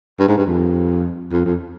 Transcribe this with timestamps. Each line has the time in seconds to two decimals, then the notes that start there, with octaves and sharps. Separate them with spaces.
0.19 G2
0.28 G#2
0.37 G2
0.47 F2
1.32 F2
1.45 F2